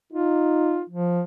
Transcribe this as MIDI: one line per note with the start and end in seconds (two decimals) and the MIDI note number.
0.13 0.82 63
0.13 0.81 65
0.90 1.22 53